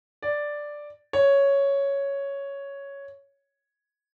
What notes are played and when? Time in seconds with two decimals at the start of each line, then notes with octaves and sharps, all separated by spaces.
0.22 D5
1.13 C#5